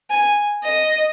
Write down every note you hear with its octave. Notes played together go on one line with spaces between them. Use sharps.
G#5
D#5